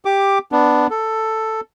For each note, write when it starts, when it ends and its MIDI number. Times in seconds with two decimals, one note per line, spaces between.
0.05 0.39 67
0.05 0.39 86
0.52 0.87 59
0.52 0.87 62
0.90 1.61 69